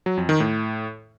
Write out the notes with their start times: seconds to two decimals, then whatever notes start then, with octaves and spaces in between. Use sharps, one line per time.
0.06 F#3
0.17 F2
0.29 D#3
0.40 A2